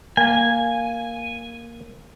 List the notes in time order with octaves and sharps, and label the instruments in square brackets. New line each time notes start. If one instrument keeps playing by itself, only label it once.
[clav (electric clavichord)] A#3 [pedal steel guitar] G#5